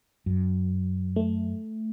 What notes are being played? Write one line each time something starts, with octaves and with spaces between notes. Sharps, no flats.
F#2
A3